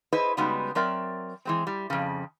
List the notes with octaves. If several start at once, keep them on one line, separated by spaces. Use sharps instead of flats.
E4 G#4 B4 C5 D#5
C#3 G3 G#3 B3 D#4 F#4
F#3 C4 A#4 D5 E5
E3 G#3 C4
G3
F2 C#3